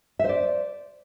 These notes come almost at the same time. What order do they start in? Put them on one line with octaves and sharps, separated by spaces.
E5 C5 D5